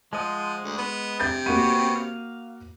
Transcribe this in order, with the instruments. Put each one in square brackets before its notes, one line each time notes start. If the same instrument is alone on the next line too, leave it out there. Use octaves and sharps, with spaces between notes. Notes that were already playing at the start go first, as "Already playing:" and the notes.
[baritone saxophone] F3 [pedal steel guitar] G#3 D#5 F#5
[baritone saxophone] D2
B3
[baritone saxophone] C3 [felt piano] G6 A6
[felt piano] A#3 F#4 D#7 [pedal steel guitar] B3 G4 C#5
[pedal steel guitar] F5